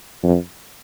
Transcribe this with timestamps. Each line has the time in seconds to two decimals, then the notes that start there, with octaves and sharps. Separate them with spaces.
0.23 F2